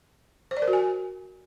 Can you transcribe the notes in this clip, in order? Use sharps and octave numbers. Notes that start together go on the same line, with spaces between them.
C5
D5
A#4
F#4
G#5